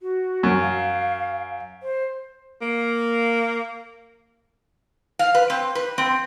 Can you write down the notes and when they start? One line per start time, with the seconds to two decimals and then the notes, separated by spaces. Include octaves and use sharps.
0.02 F#4
0.43 F#2
0.61 F5
1.83 C5
2.61 A#3
5.19 F5
5.35 B4
5.50 C4
5.75 B4
5.98 C4